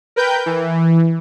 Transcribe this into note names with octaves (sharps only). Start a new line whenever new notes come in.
A#4 B4 G5 G6
E3